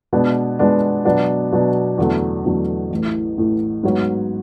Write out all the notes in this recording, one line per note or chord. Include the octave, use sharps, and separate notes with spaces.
B2 G#3 B3 D4
B2 G#3 B3 D4
B2 F#3 B3 D4
B2 F#3 B3 D4
E2 D3 F#3 A3
E2 D3 F#3 A3
A1 A2 E3
A1 A2 E3
G#2 F#3 B3 F#4 C#5